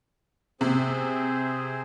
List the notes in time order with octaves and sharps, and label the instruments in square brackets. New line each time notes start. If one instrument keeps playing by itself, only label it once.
[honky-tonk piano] C3 [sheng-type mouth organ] C4 G#4 C5